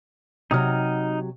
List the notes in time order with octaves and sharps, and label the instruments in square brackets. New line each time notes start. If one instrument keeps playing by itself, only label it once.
[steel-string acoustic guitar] C3 F#3 [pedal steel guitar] D#4 D#6 F6